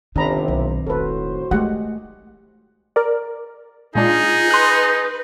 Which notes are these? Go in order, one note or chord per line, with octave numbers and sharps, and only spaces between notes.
G1 C3 D#3 C4 D4 D#4 A#5 B5
B1
E1 A2 F#4 A4 B4 C5
G#3 A3 G4 F#5
A#4 D5
A#2 G#3 D4 D#4 F4 G#4
B4 C6 F#6